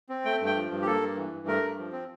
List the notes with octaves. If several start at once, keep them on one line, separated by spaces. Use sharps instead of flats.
C4
A3 G5
G2
G5
F3
G2
G4
A#3 A4
G2
E3
G2
A3 A#4
G2
F3
C4